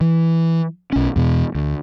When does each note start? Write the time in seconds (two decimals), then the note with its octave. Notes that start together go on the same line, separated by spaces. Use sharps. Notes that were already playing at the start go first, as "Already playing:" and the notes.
0.01 E3
0.92 B1 C#4
1.16 E2 B2
1.55 D2